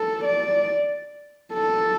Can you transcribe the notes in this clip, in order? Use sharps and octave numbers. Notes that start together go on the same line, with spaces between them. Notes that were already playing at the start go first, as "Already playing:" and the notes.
Already playing: A4
D5
A4